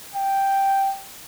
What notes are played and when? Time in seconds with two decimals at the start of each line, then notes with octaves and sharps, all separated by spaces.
0.14 G5